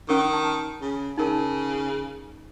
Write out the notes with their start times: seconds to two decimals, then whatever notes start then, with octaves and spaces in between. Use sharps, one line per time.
0.09 D#3 C#4 A#4 C#6
0.33 A5
0.81 C#3
1.18 C#3 D#4 A#4 A5